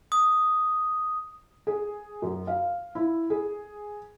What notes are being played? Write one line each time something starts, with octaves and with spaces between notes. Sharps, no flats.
D#6
G#4
F#2
F5
E4
G#4